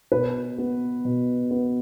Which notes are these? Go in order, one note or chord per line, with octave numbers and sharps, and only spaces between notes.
B2 B4
B3
B2
B3